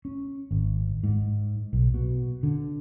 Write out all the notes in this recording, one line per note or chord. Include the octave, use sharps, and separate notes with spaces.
C#4
G#1
G#2
B1
B2
D3